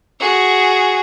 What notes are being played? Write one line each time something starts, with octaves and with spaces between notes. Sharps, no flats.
F#4 G#4